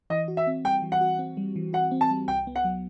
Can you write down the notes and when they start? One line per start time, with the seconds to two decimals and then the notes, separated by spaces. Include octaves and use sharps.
0.10 E3 D#5
0.28 F#4
0.37 E5
0.47 C4
0.65 G3 G5
0.82 E3
0.92 F#5
1.01 F#4
1.19 C4
1.37 G3
1.56 E3
1.73 F#4 F#5
1.91 C4
2.01 A5
2.11 G3
2.28 C2 G5
2.47 B3
2.56 F#5
2.64 F#3